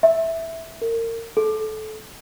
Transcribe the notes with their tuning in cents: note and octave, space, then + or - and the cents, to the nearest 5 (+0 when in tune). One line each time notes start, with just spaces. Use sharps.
E5 -5
A#4 -30
A4 -20